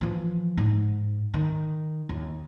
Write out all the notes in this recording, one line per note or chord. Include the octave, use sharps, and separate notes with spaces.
E3 F3
G#2
D#3
D#2